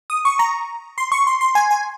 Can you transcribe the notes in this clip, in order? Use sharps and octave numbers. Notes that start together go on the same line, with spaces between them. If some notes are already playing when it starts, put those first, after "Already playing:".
D#6
C#6
A#5
C6
C#6
C6
C6
G#5
G#5